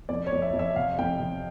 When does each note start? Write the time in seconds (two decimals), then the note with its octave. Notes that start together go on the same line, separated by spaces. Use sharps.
0.09 F2 D5
0.26 C#5
0.32 F2
0.42 E5
0.53 F2
0.59 E5
0.76 C3 F5
0.98 F2 G5
1.20 C3